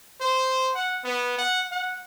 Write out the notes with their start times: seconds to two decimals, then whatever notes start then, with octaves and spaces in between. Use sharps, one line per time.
0.21 C5
0.75 F#5
1.04 B3
1.38 F#5
1.72 F#5